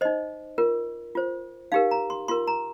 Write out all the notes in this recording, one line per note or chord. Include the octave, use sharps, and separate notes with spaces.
D#4 C5 D#5
F4 A#4
F4 C5
D#4 G4 A#4 F5
A#5
C6
F4 A#4 C6
A#5